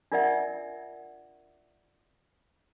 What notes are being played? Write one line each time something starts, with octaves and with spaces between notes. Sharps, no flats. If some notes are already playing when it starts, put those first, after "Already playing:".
D4 F4 A#4 D5 E5 F#5